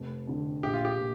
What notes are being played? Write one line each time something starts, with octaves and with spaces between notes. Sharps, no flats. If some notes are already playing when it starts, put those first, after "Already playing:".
Already playing: F1
F2 D3
A#1 G4
F4
G4
A#2